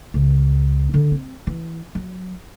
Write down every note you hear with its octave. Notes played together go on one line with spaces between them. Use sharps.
C#2
D3
C4
E3
F#3